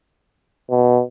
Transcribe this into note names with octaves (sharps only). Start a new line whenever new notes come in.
B2